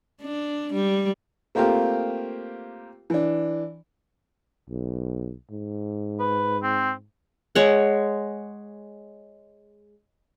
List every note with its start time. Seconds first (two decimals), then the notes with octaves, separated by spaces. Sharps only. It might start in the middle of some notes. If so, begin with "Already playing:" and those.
0.21 D4
0.73 G3
1.55 A3 A#3 C4 F4 G4 A#4
3.10 E3 D4
4.70 B1
5.51 G#2
6.20 B4
6.63 C4
7.55 G#3 C#5 F#5